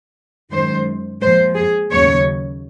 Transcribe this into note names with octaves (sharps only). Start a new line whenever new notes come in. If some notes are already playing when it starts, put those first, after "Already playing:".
F#2 D#3 G#3 C5
A#2 F3 G#3 C5
G#4
D#2 C#3 F#3 C#5